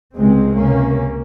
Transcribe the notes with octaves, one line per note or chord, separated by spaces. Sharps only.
C#2 C3 G#3 C4
C#2 C3 A#3 C#4